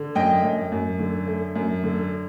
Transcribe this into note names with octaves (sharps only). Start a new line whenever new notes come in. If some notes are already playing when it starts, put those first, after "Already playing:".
Already playing: D3
F#2 D#5 G5
F#2
F#2
D3
A3
F#2
D3